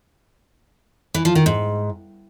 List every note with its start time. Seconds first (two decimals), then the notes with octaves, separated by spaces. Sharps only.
1.14 E3
1.25 F3
1.35 D#3
1.46 G#2